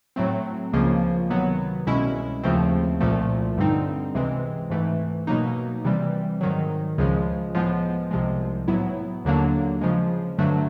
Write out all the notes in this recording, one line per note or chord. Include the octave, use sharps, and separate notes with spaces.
A2 F#3 A3 C4
C#2 C#3 F3 A#3
C3 D#3 F#3 B3
C2 B2 G#3 C#4 E4
D#2 C#3 F3 A3 C4
C2 A#2 F3 A3
G2 D3 G3 C4 D#4
C#2 C3 E3 G#3 C4
G#2 E3 A3
B2 F#3 A#3 D#4
C3 E3 G3 C4
G#2 D#3 F#3
C#2 C#3 F3 G#3
A2 F3 G#3 B3
C2 C3 F3 G#3
A2 F#3 B3 E4
D#2 D3 F#3 A#3 D4
C#3 F3 G#3
G2 D3 F#3 A3 D4